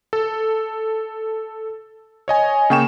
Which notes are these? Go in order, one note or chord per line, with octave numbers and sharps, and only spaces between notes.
A4
C#5 D#5 G#5
C#3 A#3 G5 C#6 E7